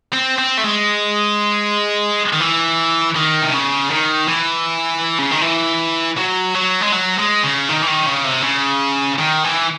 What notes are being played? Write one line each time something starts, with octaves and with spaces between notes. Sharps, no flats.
C4
C4
A3
G#3
D#3
E3
D#3
C3
C#3
D#3
E3
C#3
D#3
E3
F#3
F#3
G#3
F#3
G#3
C#3
D#3
E3
D#3
C#3
C3
C#3
D#3
E3